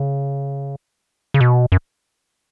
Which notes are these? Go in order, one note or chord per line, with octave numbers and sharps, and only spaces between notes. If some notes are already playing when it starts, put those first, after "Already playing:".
Already playing: C#3
C#3
B2
F#2